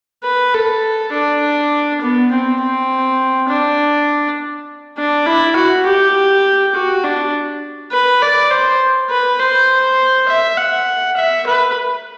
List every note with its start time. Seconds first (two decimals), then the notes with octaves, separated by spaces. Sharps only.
0.24 B4
0.54 A4
1.13 D4
2.01 B3
2.32 C4
2.61 C4
3.49 D4
4.98 D4
5.26 E4
5.56 F#4
5.86 G4
6.75 F#4
7.04 D4
7.92 B4
8.22 D5
8.51 C5
9.10 B4
9.39 C5
10.29 E5
10.58 F#5
11.16 E5
11.47 B4